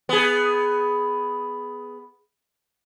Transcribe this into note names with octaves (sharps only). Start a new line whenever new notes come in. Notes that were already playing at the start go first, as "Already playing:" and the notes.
B3 G#4